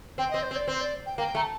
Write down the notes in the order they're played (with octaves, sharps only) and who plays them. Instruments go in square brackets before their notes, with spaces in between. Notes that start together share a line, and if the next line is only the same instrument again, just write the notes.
[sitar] C4 [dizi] G5
[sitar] C4 [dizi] D#5
[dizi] C5
[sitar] C4
[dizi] D5
[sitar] C4 [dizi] C5
[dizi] D5
G5
[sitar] A#3 [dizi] G5
[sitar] A3 [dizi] A#5
[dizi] A5